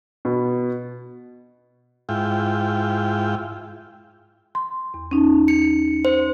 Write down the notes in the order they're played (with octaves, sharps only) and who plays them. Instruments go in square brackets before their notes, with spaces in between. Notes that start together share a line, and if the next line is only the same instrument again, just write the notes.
[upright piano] B2
[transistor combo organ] G#2 E4 F4 G5
[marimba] C6
E2
C#4 D#4
[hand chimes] C#7
C5